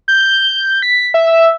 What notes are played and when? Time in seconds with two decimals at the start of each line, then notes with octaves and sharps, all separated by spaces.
0.08 G6
0.82 B6
1.14 E5